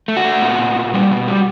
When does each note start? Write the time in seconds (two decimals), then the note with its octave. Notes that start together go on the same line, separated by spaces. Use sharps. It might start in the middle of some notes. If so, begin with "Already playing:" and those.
0.08 A3
0.17 F#4
0.25 A3
0.42 A#2
0.59 A#2
0.76 A#2
0.94 G3
1.11 B2
1.28 G3